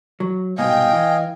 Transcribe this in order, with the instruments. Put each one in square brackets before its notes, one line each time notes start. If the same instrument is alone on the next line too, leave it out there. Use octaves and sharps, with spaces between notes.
[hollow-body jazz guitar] F#3
[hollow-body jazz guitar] C2 G#2 B2 [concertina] D#5 F5 G#5 [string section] G5
[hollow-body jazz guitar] E3